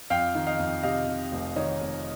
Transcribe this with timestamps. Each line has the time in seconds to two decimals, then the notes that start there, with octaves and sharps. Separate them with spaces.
0.10 F2 F5 G5
0.35 D#3
0.47 D#5 F5
0.59 F2
0.83 C3 D#5 F5
1.08 C3
1.32 F1
1.56 D#3 C#5 D#5
1.81 F1